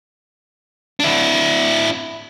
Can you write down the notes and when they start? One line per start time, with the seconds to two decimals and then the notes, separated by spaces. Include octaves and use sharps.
1.00 D4 E4